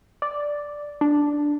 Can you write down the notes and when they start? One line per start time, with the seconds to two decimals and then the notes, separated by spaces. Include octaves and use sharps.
0.22 D5
1.01 D4